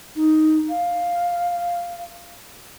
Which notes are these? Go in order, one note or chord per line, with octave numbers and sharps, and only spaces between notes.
D#4
F5